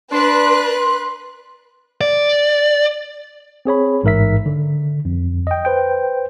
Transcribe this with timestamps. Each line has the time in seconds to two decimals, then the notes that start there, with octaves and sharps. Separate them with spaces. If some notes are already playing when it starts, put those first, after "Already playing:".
0.12 D4 B4 C6 F#6
2.01 D5
3.65 C4 G#4 C#5 B5
4.03 A1 G#2 A#4 E5 B6
4.46 D3
5.05 F2
5.47 D#5 G5
5.65 B4 C5 G5